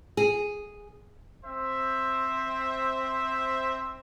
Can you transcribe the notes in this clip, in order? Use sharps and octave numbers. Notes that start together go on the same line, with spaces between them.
G#4
C4 C5 E5